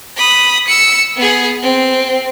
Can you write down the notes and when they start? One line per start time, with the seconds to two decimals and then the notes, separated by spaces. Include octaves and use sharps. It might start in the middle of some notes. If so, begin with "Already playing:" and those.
0.17 B5 D#6
0.67 E6 C#7
1.16 B3 G#4
1.63 C4